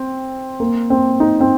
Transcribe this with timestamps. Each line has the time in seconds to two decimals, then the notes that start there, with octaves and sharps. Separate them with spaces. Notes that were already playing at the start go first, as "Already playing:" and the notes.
Already playing: C4
0.60 A#3
0.90 C4
1.20 D#4
1.41 C4